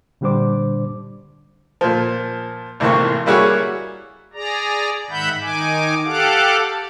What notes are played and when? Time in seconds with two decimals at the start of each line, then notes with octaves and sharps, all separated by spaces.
0.21 A#2 D3 G3 D4 C5 D6
1.81 A#2 F3
2.80 G#1 A2 C3 E3 A#3 C#6
3.26 G3 A#3 E4 F#4 G#4 C#5
4.33 G#4 D5 A#5
5.10 G#2 D#3 E5 F#5 B5 G6
5.41 D#3 D#4 G#5 D6
6.04 G4 A4 F5 F#5 D6